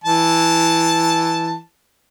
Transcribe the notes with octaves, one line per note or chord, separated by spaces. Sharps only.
E3 A5